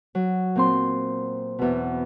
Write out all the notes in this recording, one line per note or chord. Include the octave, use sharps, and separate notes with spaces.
F#3
A#2 C4 C6
E2 B2